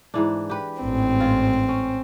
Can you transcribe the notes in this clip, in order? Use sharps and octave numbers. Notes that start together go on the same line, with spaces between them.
G#2 E3 D4
G4 B4
A1 G#2 C4
F4
C#4